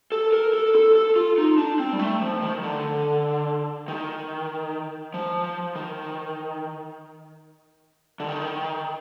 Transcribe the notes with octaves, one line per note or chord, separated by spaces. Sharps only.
A4
A#4
A4
A4
A4
F4
D#4
D4
C4
G3
A3
F3
D#3
D3
D#3
F3
D#3
D3
D#3